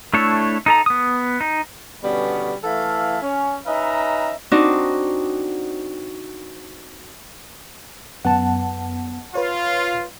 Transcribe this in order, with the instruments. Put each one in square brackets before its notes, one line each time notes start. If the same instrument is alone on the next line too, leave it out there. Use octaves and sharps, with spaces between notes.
[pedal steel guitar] A3 D4 E4 A4 C#5
D#4 A4 A#5
B3 D#6
D#4
[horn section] B2 D3 G3 B3 C#4
E3 A3 E4 A4 F5
C#4
C#4 D#4 B4 D#5 E5 A#5
[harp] C4 D4 D#4 F#4
[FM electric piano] F#2 B3 [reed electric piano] F#5 A5
[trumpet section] F4 [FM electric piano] B4 C#5